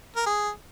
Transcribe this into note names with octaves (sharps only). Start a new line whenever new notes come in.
A#4
G#4